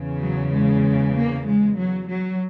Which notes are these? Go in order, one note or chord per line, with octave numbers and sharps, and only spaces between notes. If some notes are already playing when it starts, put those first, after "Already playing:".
Already playing: E2 C#3
F#3
G#3
A#3
G#3
F#3
F#3